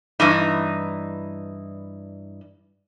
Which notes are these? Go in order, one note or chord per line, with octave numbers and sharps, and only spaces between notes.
G2 E3 D#4